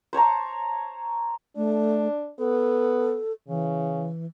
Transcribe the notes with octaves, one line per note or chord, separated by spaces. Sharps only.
C5 C#5 A5 A#5
A3 D4
B3 A4
C#3 E3